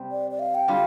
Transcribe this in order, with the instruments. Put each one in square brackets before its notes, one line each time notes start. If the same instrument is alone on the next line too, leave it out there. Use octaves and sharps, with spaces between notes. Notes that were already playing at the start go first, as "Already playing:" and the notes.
Already playing: [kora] C3 G3 C4
[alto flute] D5
D5
F5
G5
[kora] D3 G3 F4 [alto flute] F5